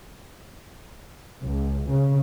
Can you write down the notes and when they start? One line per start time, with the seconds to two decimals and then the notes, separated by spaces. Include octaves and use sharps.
1.45 C#2
1.91 C#3